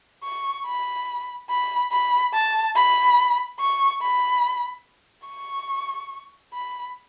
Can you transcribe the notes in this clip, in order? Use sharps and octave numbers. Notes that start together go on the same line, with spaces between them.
C#6
B5
B5
B5
A5
B5
C#6
B5
C#6
B5